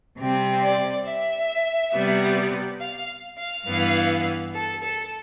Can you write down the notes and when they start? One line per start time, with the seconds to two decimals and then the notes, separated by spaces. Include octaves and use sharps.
0.20 C3 G3 C4
0.63 D5
1.06 E5
1.93 C3 G3 B3
2.80 F5
3.39 F5
3.66 G2 E3 B3
4.54 A4
4.83 A4